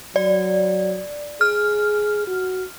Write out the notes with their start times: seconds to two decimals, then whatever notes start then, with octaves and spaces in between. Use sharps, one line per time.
0.16 F#3 D5
1.41 G#4 F6
2.27 F#4